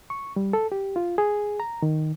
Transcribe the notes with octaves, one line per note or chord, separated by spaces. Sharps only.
C#6
G3
A4
G4
F4
G#4
A#5
D#3